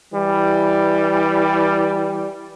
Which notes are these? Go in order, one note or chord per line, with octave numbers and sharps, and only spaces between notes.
E3 G3